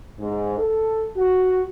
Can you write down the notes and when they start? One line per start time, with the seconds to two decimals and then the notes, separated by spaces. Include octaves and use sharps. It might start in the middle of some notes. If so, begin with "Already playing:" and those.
0.20 G#2
0.57 A4
1.16 F#4